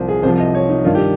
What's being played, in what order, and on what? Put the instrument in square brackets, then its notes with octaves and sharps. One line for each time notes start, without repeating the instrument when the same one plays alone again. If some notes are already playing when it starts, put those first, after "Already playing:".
Already playing: [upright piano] C2 F3 C5
G#4
C2 C3 F3 C5
D#5
C#5
D#4
G2 D#3 F4
G4